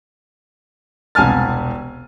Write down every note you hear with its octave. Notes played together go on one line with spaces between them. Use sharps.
E1 C2 G#5 A5 F6 A6